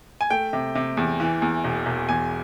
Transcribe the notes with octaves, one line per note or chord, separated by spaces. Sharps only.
G#5
A3 G5
C3
C3
E2
E3
E2
E1
E1
E2 G#5